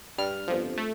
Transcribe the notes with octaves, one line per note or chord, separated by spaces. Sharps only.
G2 G3 F6
G1 F2 F3
A3